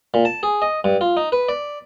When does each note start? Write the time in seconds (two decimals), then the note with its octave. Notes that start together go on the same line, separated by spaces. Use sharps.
0.14 A#2
0.25 A5
0.43 G#4
0.62 D#5
0.84 G2
1.01 F4
1.17 D#4
1.32 B4
1.49 D5